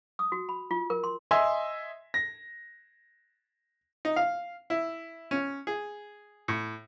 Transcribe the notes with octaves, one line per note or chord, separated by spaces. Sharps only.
D#6
F#4
B5
F4
A#4
C6
D#5 E5 G#5 C6
A#6
D#4
F5
E4
C#4
G#4
A2